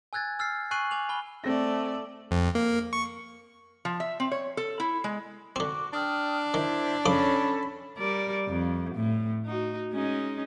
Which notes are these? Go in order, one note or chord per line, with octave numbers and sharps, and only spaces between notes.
G#5 E6 F#6 G#6 A6
E6 F6 A6 C7
G#5 C#6 F#6 C7 D#7 F#7
G#5 D6 F7 F#7
G#5 B5 F6 G7
A3 C4 D5 A#6
F2
A#3
C#6
F3
E5
C4
C#5
A4
E4
G#3
D3 C4 F#4 C#6 D6
D4 G5 D#6 F6
D#3 E4 C5 A5
F2 C#3 C#4 A4 A5 B5 D6
G3 A#4 D5
F2
A2
D#4 F#4
G#3 C#4 D#4